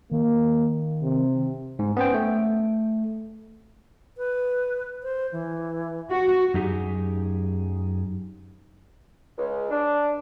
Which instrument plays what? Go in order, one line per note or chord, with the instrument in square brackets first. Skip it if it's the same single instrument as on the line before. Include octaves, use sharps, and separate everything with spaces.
[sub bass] D#3 [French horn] A#3
[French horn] C3
[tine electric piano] G#2
B3 C#4 C5 G5
A3
[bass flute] B4
C5
E3
[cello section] F#4
[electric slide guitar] F#2 D#4 G4 G#4
[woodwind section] C#2
D4